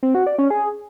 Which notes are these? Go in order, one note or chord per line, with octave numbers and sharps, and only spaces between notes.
C4
F#4
D5
C#4
G#4